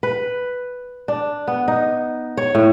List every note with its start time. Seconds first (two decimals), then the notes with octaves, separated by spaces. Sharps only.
0.03 B4
1.08 D4
1.48 B3
1.68 D#4
2.37 C#5
2.55 A2